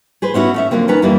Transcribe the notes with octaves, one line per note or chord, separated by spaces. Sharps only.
G#4 B4 C5
B3 C#4 E4 F#4
A3 C#4 E5
D3 F3 F#3 A#3 C4
D#3 C#4 B4 A#5
F#2 E3 G3 A#3 D4 E4